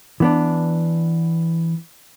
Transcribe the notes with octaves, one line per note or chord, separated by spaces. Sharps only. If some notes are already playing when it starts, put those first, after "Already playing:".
E3 B3 D4